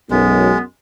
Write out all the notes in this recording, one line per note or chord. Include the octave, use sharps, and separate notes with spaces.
B1 F#2 G#3 B3